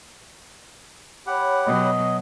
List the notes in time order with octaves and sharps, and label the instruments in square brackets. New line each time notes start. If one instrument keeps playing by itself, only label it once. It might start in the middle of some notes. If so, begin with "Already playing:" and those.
[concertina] G4 F#5 [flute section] C#5 B5
[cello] B2 F#3 [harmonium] D#5